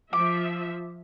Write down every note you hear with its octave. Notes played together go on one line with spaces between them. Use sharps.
F3 E5 D6